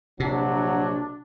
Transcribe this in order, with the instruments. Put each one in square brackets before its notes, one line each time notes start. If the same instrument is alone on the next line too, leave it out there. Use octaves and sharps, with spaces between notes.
[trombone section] A#1 F#3 [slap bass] C3 [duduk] D4